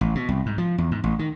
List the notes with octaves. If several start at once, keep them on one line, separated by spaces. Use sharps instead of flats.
A1
B2
C2
G#2
F3
E2
G#2
A1
D#3